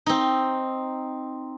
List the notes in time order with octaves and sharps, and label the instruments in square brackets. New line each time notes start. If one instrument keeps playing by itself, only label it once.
[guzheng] C4 D#4